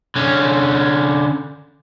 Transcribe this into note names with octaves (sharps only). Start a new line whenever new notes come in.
D3 C#4